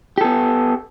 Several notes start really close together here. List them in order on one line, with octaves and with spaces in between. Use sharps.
G4 A4 B3